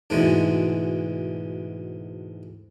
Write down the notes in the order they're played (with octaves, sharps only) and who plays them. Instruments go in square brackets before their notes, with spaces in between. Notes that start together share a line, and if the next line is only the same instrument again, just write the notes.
[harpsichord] D2 G#2 B2 D3 E3 G#3